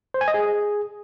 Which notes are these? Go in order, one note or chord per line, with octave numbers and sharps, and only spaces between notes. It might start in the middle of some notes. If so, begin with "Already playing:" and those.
C5
G#5
D#5
G#4